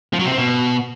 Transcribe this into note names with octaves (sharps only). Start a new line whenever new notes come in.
F3
F#3
C3
C4
B2